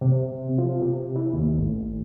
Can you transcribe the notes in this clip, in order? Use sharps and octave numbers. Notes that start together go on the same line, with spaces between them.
C3
F3
C3
E3
D#2
A1